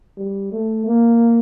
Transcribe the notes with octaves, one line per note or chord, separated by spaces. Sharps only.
G3
A3
A#3